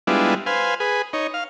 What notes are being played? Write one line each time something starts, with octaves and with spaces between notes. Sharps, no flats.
G3 G#3 B3 D4 E4 F4
B4 C5 F5 G#5
G#4 B4
D#4 C#5
F5